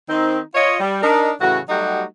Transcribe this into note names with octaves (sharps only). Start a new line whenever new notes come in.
D#3 C4 D#4
F4 C#5 D#5
G3
D4 D#4 A#4
A2 C#3 E3 F#4
F#3 G3 A3 D#4 F#4 G4